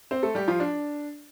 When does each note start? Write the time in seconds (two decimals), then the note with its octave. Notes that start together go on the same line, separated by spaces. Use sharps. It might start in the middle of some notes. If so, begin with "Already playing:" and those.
0.11 C4 C5
0.23 A3 A4
0.35 G3 G4
0.48 F3 F4
0.60 D4